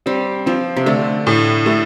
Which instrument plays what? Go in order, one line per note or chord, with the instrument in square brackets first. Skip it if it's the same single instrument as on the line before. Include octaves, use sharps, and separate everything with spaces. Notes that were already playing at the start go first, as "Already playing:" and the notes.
[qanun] G3 [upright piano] C4
[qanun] F3 [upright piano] C4
[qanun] C3
[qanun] D3 [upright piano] A3
[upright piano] A2
A3